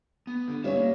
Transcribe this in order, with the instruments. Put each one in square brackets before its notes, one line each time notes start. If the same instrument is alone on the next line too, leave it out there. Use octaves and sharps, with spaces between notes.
[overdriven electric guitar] B3
D3
[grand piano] G3 C#4 [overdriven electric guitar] E5 F5
[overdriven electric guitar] A#3